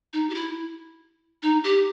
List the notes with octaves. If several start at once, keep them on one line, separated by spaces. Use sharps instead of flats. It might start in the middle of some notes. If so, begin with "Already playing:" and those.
D#4
G4
E4
D#4
G4